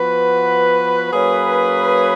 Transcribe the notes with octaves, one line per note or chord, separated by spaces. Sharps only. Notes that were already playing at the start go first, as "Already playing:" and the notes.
Already playing: F3 B3 F#4 B4
F#3 A#3 C#4 G#4 B4